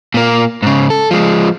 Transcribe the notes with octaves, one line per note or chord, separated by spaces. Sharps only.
A#2 A#3
G#2 C#3
A4
F3 G#3